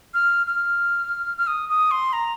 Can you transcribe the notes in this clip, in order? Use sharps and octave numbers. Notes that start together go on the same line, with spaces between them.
F6
F6
F6
D#6
D#6
C6
A#5